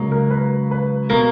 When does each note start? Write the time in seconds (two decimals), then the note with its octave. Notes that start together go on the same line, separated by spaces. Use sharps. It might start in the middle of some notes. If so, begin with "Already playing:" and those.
Already playing: C#2 C#3 F#3 A#3
0.12 A#4
0.30 B4
0.71 B4
1.10 B2 A#3 A#4